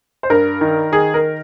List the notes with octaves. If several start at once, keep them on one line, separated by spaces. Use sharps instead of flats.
C5
G2 A#4
D#3
D#3 G#4
A#4